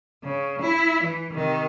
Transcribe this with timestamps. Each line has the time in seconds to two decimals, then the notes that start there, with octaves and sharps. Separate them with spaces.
0.23 C#3
0.61 E4
1.02 E3
1.32 C3 D#3